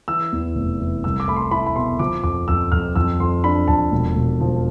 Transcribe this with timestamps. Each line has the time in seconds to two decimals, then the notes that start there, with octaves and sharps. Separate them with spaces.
0.08 E3 E6
0.32 E2
0.56 F1
0.79 E3
1.04 C2 E6
1.20 D6
1.28 A3 B5
1.36 C6
1.51 E4 B5
1.66 B5
1.76 B2 C6
1.99 F3 D6
2.24 F2 D6
2.48 F2 E6
2.72 F2 F6
2.96 F2 E6
3.20 F2 C6
3.44 D4 B5
3.68 F2 A5
3.92 E1
4.15 E1
4.41 F3